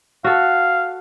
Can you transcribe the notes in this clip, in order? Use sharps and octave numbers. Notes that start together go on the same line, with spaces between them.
F#4 A4 F5